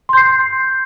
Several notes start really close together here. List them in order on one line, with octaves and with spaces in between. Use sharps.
C6 G6 C7